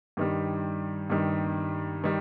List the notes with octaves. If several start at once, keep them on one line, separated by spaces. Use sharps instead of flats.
G2 D#3 G3
G2 D#3 G3
D#3 G3